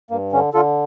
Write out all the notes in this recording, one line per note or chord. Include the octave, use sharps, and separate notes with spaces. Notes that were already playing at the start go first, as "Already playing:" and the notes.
G2 A#3
D3 C#4
D3 F4 A4